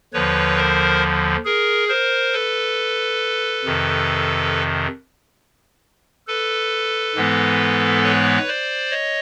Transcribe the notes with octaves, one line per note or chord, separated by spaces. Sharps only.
D#2 D3 F3 B4 C#5
A#4 C5
G#4 A#4
A#4 C5
A4 B4
F2 C3 D#3
A4 B4
G#2 E3 G#3 B3
B4 C#5
C5 D5
C#5 D#5